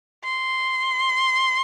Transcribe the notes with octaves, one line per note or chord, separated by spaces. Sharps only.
C6